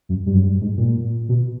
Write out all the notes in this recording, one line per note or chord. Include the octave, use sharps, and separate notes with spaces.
F#2
G2
F#2
G2
G#2
A#2
B2